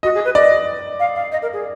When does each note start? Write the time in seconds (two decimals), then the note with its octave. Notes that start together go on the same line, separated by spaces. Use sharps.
0.03 F#4 D#5
0.15 G#4
0.25 B4
0.35 D5 D#5
1.00 F5
1.15 F5
1.32 D#5
1.42 A#4
1.53 G#4